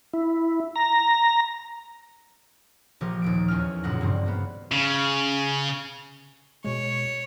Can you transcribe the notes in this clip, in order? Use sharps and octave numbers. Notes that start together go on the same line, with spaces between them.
E4
A#5
A#1 F3 G4 A#4
D#2 A#2 D7
E2 C#4 F6
E1 C#2 F#2 A#2 F#5 A#6
G2 C#3 C4
A#3 B3
C#3
B2 G#3 C#5